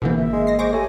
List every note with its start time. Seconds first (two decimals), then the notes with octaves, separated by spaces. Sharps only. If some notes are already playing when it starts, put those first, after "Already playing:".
0.02 G#1 B2 D3 E3 A#3 C5
0.16 E5
0.33 G#3
0.47 D#5 A#6 C7
0.59 G#3 C5 C#6 D6 A#6
0.73 A3 G4 C#5 G#5